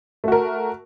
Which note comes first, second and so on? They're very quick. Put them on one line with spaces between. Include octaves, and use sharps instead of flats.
A3 F#4 A#4